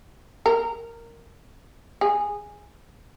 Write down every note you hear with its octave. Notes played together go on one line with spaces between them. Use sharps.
A#4
G#4